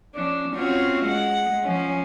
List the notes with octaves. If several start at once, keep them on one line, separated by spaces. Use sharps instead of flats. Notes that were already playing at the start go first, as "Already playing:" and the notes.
F3 C#4 D4
C4 C#4 F4 F#4 C#5
G#3 F#5
F3 C#4